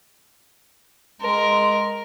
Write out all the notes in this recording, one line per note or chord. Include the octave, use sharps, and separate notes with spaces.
G#3 A#4 C6